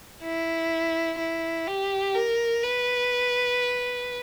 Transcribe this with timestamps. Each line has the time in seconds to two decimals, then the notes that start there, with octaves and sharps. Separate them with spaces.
0.23 E4
1.18 E4
1.67 G4
2.15 A#4
2.63 B4